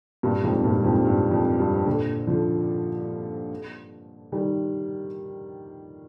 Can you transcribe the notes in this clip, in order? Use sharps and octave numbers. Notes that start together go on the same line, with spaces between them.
G2 A#2
F2 G#2
G2 A#2
F2 G#2
G2
F2
G2
A#2 D3
D3 F3
D#3 G3